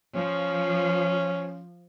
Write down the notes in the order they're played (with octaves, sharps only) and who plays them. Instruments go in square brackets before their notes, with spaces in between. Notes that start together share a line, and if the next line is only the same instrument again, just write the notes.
[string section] F3 [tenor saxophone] C#4